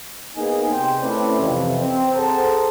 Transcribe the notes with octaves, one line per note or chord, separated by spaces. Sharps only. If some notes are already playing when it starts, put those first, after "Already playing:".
A#3 B3 D#4 G#4 G#5
C3 C5 G5
A3 C4 C#4 E4 B4 D5
F2 C3 E3
C4
G#4 A4 C5 F#5 A5 A#5